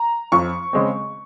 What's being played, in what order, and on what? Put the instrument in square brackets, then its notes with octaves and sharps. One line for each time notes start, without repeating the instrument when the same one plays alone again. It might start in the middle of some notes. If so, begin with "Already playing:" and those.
Already playing: [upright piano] A#5
F2 C#6
C#3 G#3 C4